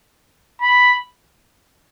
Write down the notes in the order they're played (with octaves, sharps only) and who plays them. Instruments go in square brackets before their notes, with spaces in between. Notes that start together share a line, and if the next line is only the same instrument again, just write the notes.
[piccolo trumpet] B5